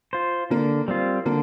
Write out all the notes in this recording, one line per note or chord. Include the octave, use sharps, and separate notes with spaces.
F4 C5
D3 A#3
G3 C4 F4
D3 A#3